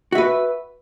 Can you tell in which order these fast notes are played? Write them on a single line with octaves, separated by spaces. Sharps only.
F#4 E5 B4